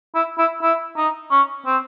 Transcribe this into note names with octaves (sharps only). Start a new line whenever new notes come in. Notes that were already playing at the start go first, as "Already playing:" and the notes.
E4
E4
E4
D#4
C#4
C4